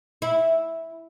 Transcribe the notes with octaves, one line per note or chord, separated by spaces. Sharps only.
E4